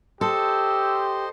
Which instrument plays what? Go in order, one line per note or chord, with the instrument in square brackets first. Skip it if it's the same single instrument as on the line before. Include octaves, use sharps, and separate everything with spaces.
[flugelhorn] G4 [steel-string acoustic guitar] A4 [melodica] C5 D#5 C6 [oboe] E6